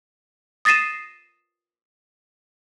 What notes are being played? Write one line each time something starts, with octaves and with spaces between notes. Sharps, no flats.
D#6 A6 A#6 C7 D#7 E7